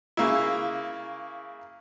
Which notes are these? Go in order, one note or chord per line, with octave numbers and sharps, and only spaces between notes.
C#3 A#3 E4